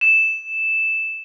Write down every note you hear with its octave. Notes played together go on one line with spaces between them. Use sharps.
E7